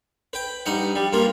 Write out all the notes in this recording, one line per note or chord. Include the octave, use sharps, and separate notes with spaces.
B4 G5
G2 D#4 F#5
G3
G2 A#3 F4